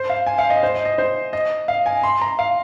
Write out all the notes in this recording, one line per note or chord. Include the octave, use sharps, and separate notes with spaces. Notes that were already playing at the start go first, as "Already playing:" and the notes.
Already playing: C5
F5
G#5
F5
D#5
C5
D#5
D#5
C5
D#5
F5
G#5
C6
A#5
F5